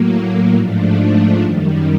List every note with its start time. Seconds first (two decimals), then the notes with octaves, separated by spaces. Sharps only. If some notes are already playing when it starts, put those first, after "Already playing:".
Already playing: A2 F#3 A#3
0.55 G#2 F3 A3 D4
1.41 F#2 D#3 G3